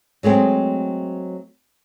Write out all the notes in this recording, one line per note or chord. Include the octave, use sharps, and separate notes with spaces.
F#3 G#3 A3 C4